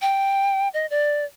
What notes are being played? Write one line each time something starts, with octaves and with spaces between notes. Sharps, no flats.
G5
D#5
D5